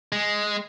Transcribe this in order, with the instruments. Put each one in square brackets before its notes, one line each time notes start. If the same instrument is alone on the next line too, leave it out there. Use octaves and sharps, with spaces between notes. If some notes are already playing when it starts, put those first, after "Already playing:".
[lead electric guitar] G#3